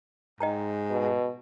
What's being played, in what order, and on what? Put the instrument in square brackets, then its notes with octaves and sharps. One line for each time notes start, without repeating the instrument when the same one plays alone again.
[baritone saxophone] G#2 [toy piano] D#5 G5 A#5
[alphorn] B2